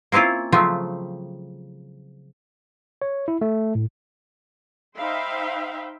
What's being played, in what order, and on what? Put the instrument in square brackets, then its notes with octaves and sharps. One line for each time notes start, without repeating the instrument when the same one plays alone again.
[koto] A#3 C4 C#4 E4 F4
C#3 F3 F#3 A3 C4
[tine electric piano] C#5
E4
A3
A2
[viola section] D#4 C5 E5 F5 G5 B5